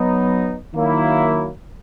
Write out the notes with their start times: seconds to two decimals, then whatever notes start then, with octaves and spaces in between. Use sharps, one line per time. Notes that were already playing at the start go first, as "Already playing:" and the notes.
Already playing: F#3 B3 D#4
0.74 D#3 F#3 A#3 E4